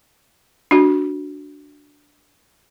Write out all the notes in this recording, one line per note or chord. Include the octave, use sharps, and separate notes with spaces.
D4 F#4